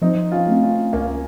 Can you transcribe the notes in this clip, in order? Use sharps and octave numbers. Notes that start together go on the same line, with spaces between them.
F3 C4 D#4
C#4 F4
A3 C4
C#4 F4
C#2 A#3 C#4